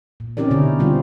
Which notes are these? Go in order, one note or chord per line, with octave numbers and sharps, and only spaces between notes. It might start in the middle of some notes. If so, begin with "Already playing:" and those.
A#2
C4 C#4 D#4 G4 A#4 D5
B2 D3 E4 G4
D3 G3 C4 F4